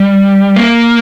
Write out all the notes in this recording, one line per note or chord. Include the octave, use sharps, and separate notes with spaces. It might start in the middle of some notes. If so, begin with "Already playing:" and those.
Already playing: G3
A#3